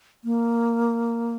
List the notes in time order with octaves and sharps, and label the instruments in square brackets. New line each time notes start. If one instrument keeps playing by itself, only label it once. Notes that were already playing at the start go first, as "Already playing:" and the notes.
[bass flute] A#3